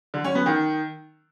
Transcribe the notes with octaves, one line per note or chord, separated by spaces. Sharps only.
D3
C#4
B3
D#3